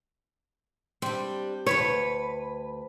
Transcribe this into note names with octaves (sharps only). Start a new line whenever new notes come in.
G3 C4 D4
D2 B2 B4 C#5